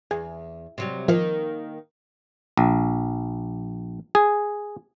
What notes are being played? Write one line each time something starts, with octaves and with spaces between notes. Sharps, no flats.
E2 G#4
C3 F#3 G3
D#3 F3 A#3
A#1
G#4